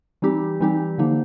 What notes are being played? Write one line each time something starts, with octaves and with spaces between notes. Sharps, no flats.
E3 G3 C4 D#4 G4
E3 G3 C4 D#4 G4
D3 F3 A#3 D#4